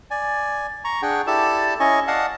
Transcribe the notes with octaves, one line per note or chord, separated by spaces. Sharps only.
D5 G#5
A#5 C#6
D4 G#4 F#5 G5
E4 G4 A4 D5 A5
C#4 E4 D#5 G#5 C#6
D5 D#5 F5 F#5 A5